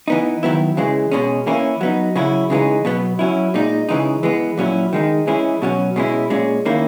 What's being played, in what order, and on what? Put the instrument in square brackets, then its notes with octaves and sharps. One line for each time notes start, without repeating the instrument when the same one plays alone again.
[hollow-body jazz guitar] E3 B3 D#4
D#3 F#3 B3 E4
C#3 E3 G#3
B2 G#3 C#4
E3 A#3 C#4 E4
F#3 B3 D#4
C#3 F#3 C#4 E4
C#3 E3 G#3 D#4
B2 F#3 B3
F#3 C#4 E4
A#2 G#3 D#4
C#3 E3 G#3 D#4
E3 G#3 B3
A#2 F#3 C#4 E4
D#3 G#3 D#4
E3 G#3 C#4 E4
B2 F#3 C#4
B2 G#3 C#4 E4
A#2 G#3 C#4
D#3 A#3 C#4 E4